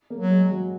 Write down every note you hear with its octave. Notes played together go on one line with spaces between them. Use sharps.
A#3
F#3
G#3
F#3